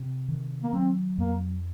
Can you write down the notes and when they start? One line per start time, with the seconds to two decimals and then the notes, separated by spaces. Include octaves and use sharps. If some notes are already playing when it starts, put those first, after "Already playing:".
Already playing: C3
0.28 D#3
0.63 A#3
0.73 F#3 C4
1.18 F2 A#3